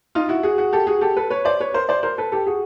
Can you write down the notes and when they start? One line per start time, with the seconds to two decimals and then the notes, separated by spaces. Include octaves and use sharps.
0.15 D#4 F4
0.29 E4 F#4
0.43 F#4 G#4
0.58 F#4 G#4
0.73 G4 A4
0.87 F#4 G#4
1.01 G4 A4
1.17 A4 B4
1.30 B4 C#5
1.45 C5 D5
1.60 B4 C#5
1.74 A#4 C5
1.89 C5 D5
2.03 A#4 C5
2.18 A4 B4
2.32 G4 A4
2.47 F#4 G#4